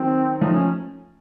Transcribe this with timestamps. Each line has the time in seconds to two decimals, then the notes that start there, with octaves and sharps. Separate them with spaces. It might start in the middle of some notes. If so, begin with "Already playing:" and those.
Already playing: D#3 F#3 C4
0.41 F3 A3 D#4
0.53 C#4